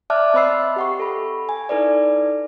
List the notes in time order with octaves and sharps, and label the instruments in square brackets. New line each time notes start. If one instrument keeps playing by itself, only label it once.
[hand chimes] D5 E5 A5 D6 F6 F#6
C4 C5 D#5 B5 E6 C7
G4 F#5 C#6
A4 B5
G#5
D#4 E4 A4 B4 D5